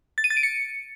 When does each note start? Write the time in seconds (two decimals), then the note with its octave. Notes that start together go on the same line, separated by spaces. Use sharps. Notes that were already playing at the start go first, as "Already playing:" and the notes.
0.18 A6
0.24 D#7
0.30 A6
0.37 D7
0.43 C#7